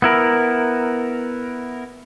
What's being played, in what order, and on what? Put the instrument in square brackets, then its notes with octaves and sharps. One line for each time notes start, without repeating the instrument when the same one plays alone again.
[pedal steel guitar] B3 E4 A#4